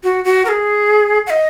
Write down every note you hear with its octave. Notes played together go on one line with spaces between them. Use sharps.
F#4
F#4
A#4
G#4
F#5
D#5